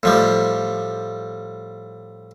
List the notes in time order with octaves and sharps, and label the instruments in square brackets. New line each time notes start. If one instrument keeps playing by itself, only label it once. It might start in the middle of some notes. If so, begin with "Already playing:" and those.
[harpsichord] A2 F3 G3